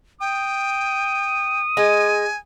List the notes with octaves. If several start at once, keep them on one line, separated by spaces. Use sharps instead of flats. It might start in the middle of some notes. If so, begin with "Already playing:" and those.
G5 D#6
G#3 G#5